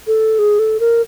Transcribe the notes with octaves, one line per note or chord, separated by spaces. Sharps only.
A4
G#4
A4
A#4